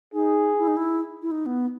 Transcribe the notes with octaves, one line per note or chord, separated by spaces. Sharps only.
D#4 G#4
E4
D#4
E4
E4
D#4
B3